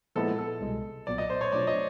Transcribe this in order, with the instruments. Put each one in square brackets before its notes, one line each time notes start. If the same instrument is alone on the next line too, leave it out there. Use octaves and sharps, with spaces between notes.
[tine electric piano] A#2 F3 G#3 B3 E4 [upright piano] A4
[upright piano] A4
[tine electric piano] C2 B2 G#3
[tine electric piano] B1 A#2 F#3 B3 [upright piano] D5
[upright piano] D#5
C5
C#5
[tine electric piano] B2 F#3 A3 D4 F4 [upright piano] D5
[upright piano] D#5